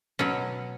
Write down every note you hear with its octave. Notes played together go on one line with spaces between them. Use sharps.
B2 F#3 C#4